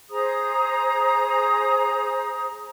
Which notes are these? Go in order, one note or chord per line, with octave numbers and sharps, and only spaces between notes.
G#4 C5 A#5 D#6